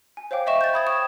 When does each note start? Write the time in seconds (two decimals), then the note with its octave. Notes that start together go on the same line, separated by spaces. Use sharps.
0.17 G#5
0.31 C5 C#5 F5 G5 D6
0.46 C#5 D#5 E5 C#6 E7
0.61 G6 A6
0.74 B5 D#6 G#6
0.87 G5 C#6 D#6 E7